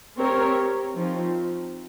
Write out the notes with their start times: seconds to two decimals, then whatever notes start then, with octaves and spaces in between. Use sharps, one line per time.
0.16 C4 G4 A#4 C#5
0.95 F3 C4 D#4